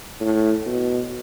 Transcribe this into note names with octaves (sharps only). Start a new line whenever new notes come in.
A2
B2